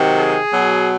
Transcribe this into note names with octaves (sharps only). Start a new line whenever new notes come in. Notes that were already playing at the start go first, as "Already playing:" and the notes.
Already playing: C3 D#3 F#3
G#4
B2 F#3